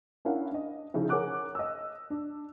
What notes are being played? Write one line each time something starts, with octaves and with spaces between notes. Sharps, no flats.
C#4 D4 E4 A#4 F5 F#5
D4 D#5
C#3 F3 D#4 E4
G#4 A#4 C#5 F#5 D6 F#6
D#5 E6
D4